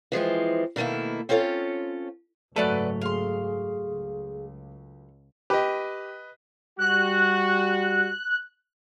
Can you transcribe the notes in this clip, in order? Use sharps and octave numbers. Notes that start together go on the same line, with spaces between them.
E3 F3 G#3 C4
B2 D#3 A3 A#3 E4
C4 C#4 F4 A4 C#5
F#1 G#2 F#3 A3 A4 B4 D5 F#5
G#4 F5 C6
C#2
G4 B4 D#5
G3 F#4 F#6